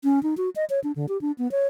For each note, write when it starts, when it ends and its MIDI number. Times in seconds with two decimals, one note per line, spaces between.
0.04 0.22 61
0.23 0.34 63
0.37 0.50 66
0.56 0.65 75
0.70 0.80 73
0.84 0.92 62
0.96 1.06 50
1.09 1.20 67
1.21 1.32 62
1.38 1.50 59
1.51 1.67 73